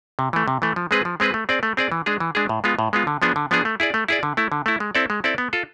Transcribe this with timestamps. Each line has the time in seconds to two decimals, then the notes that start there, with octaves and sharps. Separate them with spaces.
0.19 C3
0.33 E3 A3
0.48 C3
0.62 E3 A3
0.76 F3
0.91 G#3 C4 G#4 B4
1.05 F3
1.20 G#3 C4 G#4 B4
1.34 A3
1.49 C4 G#4 D5
1.63 A3
1.77 C4 G#4 D5
1.92 E3
2.06 G#3 D4 G#4
2.20 E3
2.35 G#3 D4 G#4
2.49 A2
2.64 G#3 B3 F4
2.79 A2
2.93 G#3 B3 F4
3.07 D3
3.22 F3 B3 D4 G#4
3.36 D3
3.51 F3 B3 D4 G#4
3.65 A3
3.80 E4 G#4 D5
3.94 A3
4.08 E4 G#4 D5
4.23 D3
4.37 A3 E4
4.52 D3
4.66 A3 E4
4.80 G#3
4.95 C4 E4 A4 D5
5.10 G#3
5.24 C4 E4 A4 D5
5.38 B3
5.53 F4 A4